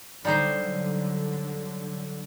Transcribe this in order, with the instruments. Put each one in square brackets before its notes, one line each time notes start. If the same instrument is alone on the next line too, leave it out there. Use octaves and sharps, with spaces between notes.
[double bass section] D3 F#3 [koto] G3 D#4 C5